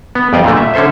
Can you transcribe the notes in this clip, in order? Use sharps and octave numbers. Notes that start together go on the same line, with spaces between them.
B3
F2 G3 D5 D#5 F5 G5
A#2 D3 A3 A#3
E5
D3 C#4 A4 C5 E5